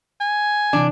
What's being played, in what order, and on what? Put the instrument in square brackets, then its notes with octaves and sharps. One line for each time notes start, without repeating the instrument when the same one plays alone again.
[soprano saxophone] G#5
[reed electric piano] C3 E3 A5 [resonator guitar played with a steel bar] D4